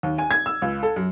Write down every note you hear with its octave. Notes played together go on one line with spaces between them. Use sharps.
D#2
G#5
G#6
E6
C#2
A4
F#2